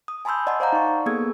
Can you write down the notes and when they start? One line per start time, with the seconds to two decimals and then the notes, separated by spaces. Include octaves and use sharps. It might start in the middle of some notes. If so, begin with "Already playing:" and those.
0.08 D#6
0.25 G#5 A5 B5 C6 E6 G6
0.47 D5 D#5 F#5 G#5 A5 C6
0.60 C5 D5 F5 F#5 A#5 G6
0.73 D#4 C#6
1.06 A#3 B3 G#4 A4 E6 G#6